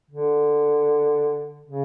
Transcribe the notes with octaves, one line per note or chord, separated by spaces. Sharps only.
D3
C#3